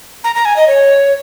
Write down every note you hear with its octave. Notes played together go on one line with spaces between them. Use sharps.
A#5
A#5
G#5
D#5
C#5